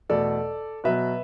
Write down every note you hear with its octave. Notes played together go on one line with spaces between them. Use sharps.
E2 B2 A3 A4 D5
B2 F#3 B3 B4 E5